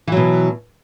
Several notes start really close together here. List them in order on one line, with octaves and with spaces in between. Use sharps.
E3 F#3 B2